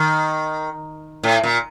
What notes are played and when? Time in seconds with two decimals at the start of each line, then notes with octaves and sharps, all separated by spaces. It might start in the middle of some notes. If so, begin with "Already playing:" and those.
Already playing: D#3
1.23 A2
1.44 A#2